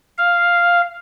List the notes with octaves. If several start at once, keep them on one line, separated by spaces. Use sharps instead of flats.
F5